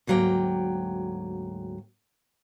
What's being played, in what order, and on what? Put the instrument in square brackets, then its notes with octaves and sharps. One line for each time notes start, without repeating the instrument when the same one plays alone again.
[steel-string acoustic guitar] D2 G#2 F#3 A#3 G5